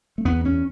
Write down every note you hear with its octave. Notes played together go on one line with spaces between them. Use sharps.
A3
E2 B3
E2 C#4